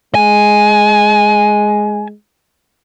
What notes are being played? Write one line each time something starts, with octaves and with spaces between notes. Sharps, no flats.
G#3 G#5